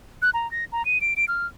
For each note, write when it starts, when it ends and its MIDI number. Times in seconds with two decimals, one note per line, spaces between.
0.22 0.30 90
0.34 0.50 82
0.51 0.65 94
0.72 0.85 82
0.85 1.01 99
1.01 1.14 98
1.17 1.25 98
1.28 1.46 89